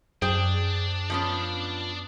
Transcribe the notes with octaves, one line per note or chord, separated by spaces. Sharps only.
F#2 D4 G#4 C5 G5
F3 B3 C#4